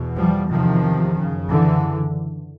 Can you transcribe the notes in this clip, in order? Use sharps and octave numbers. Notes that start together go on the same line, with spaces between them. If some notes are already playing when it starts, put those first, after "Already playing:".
Already playing: E2 B2
F3 G3
E2 C3 D#3 F3
F#2 C#3
D3 E3